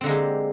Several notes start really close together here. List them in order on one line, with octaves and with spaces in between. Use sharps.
C4 D3 A#3 G#3 G4